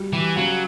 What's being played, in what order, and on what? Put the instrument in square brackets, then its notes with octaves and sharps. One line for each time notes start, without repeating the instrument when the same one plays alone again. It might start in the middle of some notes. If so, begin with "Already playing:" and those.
Already playing: [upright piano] G3 F#4
[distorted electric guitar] E3 [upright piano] G4
[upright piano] C#3 [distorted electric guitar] F#3